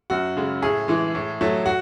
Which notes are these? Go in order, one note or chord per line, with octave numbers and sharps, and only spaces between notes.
F#2 F#4
C#3 G#3
A2 G#4
E3 G#3
A2
F#3 A3
F#4